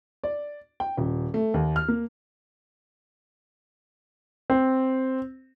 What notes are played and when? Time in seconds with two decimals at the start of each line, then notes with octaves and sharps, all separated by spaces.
0.24 D5
0.80 G5
0.97 D#1
1.34 A3
1.54 D#2
1.76 F6
1.88 A#3
4.50 C4